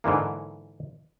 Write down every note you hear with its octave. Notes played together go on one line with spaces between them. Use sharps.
G#2 D3 E3 A#3